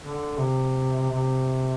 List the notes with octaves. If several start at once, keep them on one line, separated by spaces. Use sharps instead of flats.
D3
C3
C3